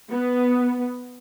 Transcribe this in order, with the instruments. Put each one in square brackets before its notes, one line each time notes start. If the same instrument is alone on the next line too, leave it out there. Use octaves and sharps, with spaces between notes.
[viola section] B3